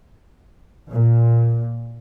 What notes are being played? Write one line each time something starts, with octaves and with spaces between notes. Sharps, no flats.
A#2